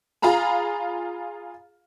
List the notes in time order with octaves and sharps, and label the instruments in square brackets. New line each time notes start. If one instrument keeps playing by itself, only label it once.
[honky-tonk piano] F4 G#4 F5 A#5 B5